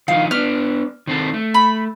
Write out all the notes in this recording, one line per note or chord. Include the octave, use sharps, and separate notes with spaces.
D#3 F3 D#4 F5
B3 D4 F6
D#3 C4 A4
A3
B5